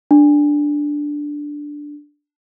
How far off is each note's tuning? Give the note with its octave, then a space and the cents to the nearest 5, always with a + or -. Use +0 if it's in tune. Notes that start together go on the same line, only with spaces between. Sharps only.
D4 +0